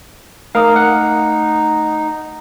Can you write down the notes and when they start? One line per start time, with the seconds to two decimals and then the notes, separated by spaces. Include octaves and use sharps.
0.55 A3 D#4 A#4 F5 D#6
0.76 F#5